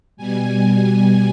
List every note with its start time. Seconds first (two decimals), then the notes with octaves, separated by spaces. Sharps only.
0.17 B2 G3 G#5